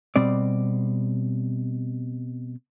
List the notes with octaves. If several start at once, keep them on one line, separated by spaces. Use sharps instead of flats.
B2 G3 C4 D5